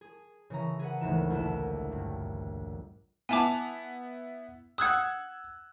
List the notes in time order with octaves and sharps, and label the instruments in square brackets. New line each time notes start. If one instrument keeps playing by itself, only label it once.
[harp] G#4
C#3 E3 A#5
G#4 B4 F#5
G#1 D2 E3 D#4 E7
A#1 E4 E7
G2
[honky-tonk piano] B3 E4 F7 [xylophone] G#5 A5 D6
[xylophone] F#5 D#6 [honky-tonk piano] E6 F#6 G#6